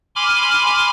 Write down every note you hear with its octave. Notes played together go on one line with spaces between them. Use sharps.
G#5 B5 C6 D6 F6